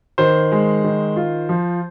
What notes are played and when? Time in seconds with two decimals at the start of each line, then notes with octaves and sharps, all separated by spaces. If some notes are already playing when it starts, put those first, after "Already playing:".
0.18 D#3 C5
0.52 G#3
0.84 D#3
1.16 F4
1.49 F3